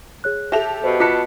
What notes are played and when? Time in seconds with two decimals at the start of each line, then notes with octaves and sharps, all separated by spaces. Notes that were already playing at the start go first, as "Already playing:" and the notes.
0.24 G#4 C#5 F#6
0.52 G4 A4 E5 F7
0.84 B2 C5
1.00 F4 A5 D6 F#6 B6 C#7